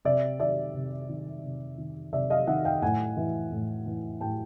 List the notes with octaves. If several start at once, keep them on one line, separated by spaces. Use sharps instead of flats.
C3 D5 E5
D#3 D5 E5
C3
D#3
C3
D#3
C3 D5 E5
D#5 F5
D#3 E5 F#5
F5 G5
A2 F#5 G#5
E3
A2
E3
A2 G5 A5